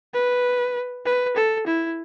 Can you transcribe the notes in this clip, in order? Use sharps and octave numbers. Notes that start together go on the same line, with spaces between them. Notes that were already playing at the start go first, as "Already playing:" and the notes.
B4
B4
A4
E4